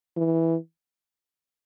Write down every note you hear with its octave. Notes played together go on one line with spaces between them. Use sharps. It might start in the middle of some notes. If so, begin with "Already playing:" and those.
E3